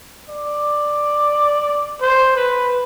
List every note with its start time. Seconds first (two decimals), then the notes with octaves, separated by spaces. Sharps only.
0.29 D5
2.01 C5
2.36 B4